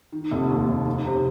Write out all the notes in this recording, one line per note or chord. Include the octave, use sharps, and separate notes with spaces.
D#3
F1
D#2
F1
D#4
C3